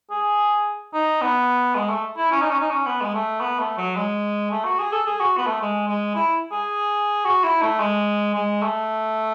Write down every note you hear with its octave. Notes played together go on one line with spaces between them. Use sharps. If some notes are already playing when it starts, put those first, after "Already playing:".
G#4
D#4
B3
G#3
A3
E4
C#4
D#4
C#4
D#4
C#4
B3
G#3
A3
B3
A3
F#3
G#3
A3
F#4
G#4
A4
G#4
F#4
B3
A3
G#3
G#3
E4
G#4
F#4
E4
A3
G#3
G#3
A3